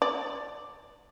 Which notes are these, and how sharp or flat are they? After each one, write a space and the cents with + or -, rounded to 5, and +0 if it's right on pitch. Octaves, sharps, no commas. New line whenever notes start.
D5 +5